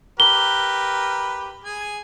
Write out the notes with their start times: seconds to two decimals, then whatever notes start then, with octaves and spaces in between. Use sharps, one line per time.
0.20 G4 A#4 B4 G7
1.64 G#4 G#5